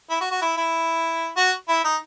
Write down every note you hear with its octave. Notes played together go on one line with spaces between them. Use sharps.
E4
F#4
F#4
E4
E4
F#4
E4
D#4